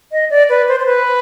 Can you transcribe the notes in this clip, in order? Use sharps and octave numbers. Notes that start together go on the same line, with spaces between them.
D#5
D5
B4
C5
C5
B4